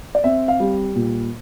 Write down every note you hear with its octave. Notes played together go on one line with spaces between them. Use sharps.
D5
C4 E5
F5
G3
A#2